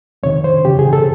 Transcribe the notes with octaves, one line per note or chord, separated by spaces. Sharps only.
F2 C3 D#3 C#5
C5
F#2 C#3 E3 G4
G#4
A4